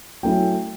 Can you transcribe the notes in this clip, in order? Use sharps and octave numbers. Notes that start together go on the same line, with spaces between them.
F#3 A3 C#4 E4 G5